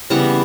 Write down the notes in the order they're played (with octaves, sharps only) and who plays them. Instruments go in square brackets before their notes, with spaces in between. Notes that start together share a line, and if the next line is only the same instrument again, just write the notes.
[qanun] C#3 E3 G3 B3 F#5